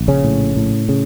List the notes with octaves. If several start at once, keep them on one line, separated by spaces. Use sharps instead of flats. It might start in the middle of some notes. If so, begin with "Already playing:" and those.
Already playing: A#1
C#3 C#4
A2
A2
C#3